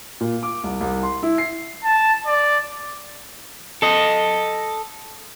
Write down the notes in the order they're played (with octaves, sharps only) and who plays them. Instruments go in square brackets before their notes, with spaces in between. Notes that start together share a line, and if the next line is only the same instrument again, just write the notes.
[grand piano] A#2
D6
C2
C2
C6
E4
C7
[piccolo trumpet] A5
D5
[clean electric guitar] A4 D#5